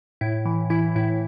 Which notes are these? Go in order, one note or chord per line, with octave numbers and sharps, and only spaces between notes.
A2 E4
E3
E3 E4
A2 E4